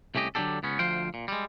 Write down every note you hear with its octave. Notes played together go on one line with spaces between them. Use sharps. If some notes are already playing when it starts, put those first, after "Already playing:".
C2 A3 C#4 G4 D#5
D3 F#3 C4 D4 G4 A4
C#2 B3 C#4
D2 F3 C5 F5 G5
A#2
G3 G#3